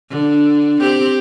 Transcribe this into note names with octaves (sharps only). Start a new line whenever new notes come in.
D3
C4 G4